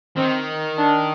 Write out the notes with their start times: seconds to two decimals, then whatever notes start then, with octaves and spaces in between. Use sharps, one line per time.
0.16 D#3 C4
0.77 D4